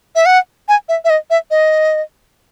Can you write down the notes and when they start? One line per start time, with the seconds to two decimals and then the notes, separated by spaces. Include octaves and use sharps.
0.16 E5
0.26 F#5
0.69 G#5
0.89 E5
1.05 E5
1.10 D#5
1.30 E5
1.51 D#5